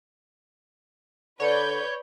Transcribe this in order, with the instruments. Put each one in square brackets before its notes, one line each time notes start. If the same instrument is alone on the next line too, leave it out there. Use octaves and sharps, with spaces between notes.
[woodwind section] D3 [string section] B4 D5 G6 [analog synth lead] C#5